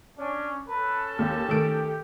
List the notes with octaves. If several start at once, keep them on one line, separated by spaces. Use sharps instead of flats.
C#4 D4
C#4 A4 B4 A5
D#2 G4
D#3 A3 D7